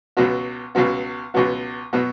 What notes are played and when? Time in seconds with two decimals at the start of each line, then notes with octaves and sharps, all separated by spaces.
0.17 C#2 B2 F#3 B3
0.75 C#2 B2 F#3 B3
1.34 C#2 B2 F#3 B3
1.93 B2 F#3 B3